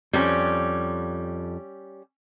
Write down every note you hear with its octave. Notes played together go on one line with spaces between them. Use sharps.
F2 G3 C#4